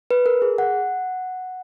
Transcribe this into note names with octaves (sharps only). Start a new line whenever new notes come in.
B4
A#4
G#4
F#5